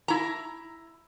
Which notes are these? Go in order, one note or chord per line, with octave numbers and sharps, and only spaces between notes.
E4 A#5